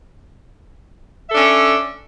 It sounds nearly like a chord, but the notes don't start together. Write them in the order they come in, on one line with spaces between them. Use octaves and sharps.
E5 A4 D4 C#4